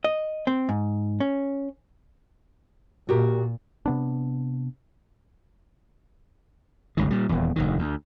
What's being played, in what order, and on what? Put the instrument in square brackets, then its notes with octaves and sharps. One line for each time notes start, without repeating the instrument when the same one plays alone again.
[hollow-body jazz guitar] D#5
C4
G#2
C#4
[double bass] A#2 [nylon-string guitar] F#4 G4 A#4
[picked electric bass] C3 B3 D4
[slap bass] G1 C#2 D#3
A#2 G3
D#1 E2
F1 D2 D#3
D2